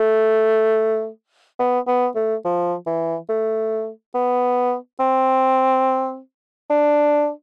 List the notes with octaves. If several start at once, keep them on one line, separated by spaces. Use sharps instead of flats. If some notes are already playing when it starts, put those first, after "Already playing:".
Already playing: A3
B3
B3
A3
F3
E3
A3
B3
C4
D4